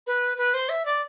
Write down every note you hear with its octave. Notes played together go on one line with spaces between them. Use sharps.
B4
B4
C5
E5
D5